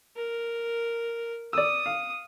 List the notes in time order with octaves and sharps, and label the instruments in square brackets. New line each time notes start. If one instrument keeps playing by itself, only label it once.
[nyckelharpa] A#4
[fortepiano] D5 E6 [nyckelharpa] D#6
[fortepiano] F5